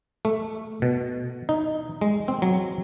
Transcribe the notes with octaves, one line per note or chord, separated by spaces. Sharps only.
A3
B2
D#4
G#3
C4
F#3